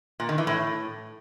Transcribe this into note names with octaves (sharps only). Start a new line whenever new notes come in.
A#2
D#3
E3
A2